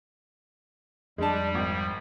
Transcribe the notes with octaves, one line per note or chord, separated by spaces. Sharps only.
F2 G3 G#3 D4 A5
G#1 G5